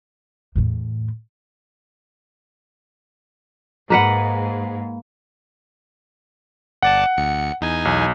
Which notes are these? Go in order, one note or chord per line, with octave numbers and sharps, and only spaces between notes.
E2 A2
G#2 A#3 B4 F#5
G1 D5 F#5 A5
D2 C#7
E2 D#4 G#5
B1